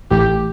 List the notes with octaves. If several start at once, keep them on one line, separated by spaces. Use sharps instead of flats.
A1 A2 E3 A3 G4